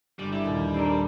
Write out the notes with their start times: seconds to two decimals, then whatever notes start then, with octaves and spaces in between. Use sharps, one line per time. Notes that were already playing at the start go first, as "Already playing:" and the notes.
0.19 G1 G3
0.32 G3 E4
0.44 D#2 A#2
0.74 C4 D4 A#4